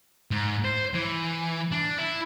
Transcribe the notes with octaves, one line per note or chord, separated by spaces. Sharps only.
G#2
C5
E3
D4
E4